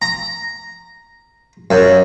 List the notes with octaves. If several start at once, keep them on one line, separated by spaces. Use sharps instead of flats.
A#5
F#2